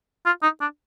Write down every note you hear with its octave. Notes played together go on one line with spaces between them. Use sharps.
F4
D#4
D4